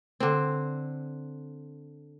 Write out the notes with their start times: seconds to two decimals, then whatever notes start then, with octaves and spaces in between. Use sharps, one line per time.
0.20 D3 C4